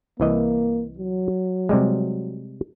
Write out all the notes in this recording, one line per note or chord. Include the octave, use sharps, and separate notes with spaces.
C2 E3 A#3 D#5
F#3
C3 G3 G#3